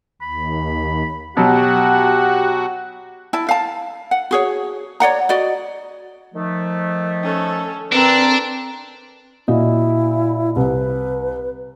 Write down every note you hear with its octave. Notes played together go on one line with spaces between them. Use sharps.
D#2 B5
B2 F#3 F#4 G4 F#5
E4 A5
F5 A5
F#5
F#4 G#4 C#5
C#5 D5 F#5 A#5
F#4 D5 D#5
D#3 F3 A3
C#4 A4
D3 C4 D4 A#4 B4 E6
A#2 E4 F#4 D#5
C2 B4